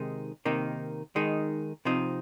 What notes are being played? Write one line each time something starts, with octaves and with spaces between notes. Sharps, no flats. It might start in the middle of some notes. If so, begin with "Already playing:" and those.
Already playing: C3 D#3 G#3 D#4
C3 D#3 A#3 D#4
D#3 G#3 D#4
C3 F3 C4 D#4